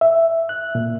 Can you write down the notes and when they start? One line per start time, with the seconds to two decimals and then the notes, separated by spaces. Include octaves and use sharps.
0.01 E5
0.49 F#6
0.75 A#2